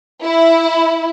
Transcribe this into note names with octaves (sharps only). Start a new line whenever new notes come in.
E4